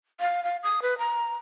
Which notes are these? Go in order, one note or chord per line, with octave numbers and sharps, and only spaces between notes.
F5
F5
D#6
B4
A#5